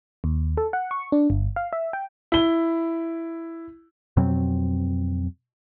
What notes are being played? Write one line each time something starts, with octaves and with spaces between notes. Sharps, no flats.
D#2
A4
F#5
C#6
D4
G1
F5
E5
G5
E4 G7
F2 B2 F#3 C4